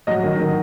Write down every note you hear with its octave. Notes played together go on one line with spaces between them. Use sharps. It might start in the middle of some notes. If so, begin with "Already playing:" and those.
F#3 D#5
D#3
D#3